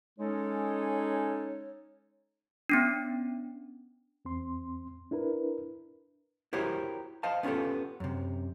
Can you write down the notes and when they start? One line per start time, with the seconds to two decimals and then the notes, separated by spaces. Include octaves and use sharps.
0.19 G#3 C#4 D#4 A4 C#5
2.69 B3 C#4 D4
4.25 E2 C4 C6
5.11 D4 E4 A#4 B4
6.53 E4 F#4 G4 A#4 C5 C#5
7.23 C5 D#5 F5 A5
7.43 B3 C#4 F4 G4 A4
8.00 F#2 C3